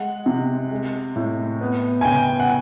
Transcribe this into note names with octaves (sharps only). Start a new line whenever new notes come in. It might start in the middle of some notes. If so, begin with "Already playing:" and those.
Already playing: G#3 F#5
C3
G#3
A2
B3
G#5
C#3 G5
F#5